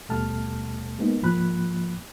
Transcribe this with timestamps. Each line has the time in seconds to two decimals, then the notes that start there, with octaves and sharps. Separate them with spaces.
0.09 D#2 B2 G3 A3 A5 F6
0.99 G#3 A#3 B3 D#4
1.22 C2 G#2 F3 A#3 B5 F#6